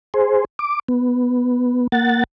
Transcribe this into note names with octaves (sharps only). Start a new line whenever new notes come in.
G#4 C5
D6
B3
A#3 F#5 A6